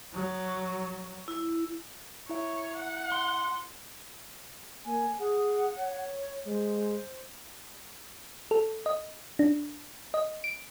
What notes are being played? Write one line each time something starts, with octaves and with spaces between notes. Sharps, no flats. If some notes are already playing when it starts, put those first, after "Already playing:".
F#3
E4
E4 C#5 E5
F#5
C6
A#3 G#5
G#4 F#5
C#5
G#3 C5
A4
D#5
D4
D#5
D7